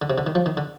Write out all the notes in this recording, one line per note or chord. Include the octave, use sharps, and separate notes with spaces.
D3
C3
D3
D#3
F3
D#3
D3